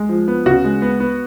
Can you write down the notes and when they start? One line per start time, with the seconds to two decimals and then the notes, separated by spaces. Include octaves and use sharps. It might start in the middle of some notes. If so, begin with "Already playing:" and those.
Already playing: G#3
0.09 F3
0.28 B3
0.46 C#3 F#4
0.64 G#3
0.82 B3
1.00 B3